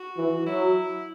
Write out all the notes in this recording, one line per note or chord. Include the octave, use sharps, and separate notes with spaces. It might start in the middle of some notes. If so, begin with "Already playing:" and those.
Already playing: F#4
E3
F#3 E4